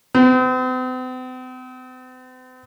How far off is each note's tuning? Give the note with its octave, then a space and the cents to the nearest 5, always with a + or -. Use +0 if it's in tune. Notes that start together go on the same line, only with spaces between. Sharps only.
C4 -45